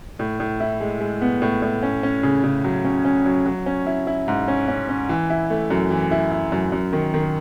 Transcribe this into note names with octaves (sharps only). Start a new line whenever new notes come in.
A2
A2
E4
G#3
G#3
B3
A2
A2
C#4
C#4
C#3
C#3
F#3
C#4
C#4
F#3
F#3
C#4
E4
E4
G#2
C#4
C#4
C#4
E3
E4
A3
F#2
E3
E4
E4
F#2
F#2
D#3
D#3